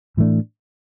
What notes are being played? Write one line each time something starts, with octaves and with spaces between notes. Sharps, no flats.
A2 E3 A3 D4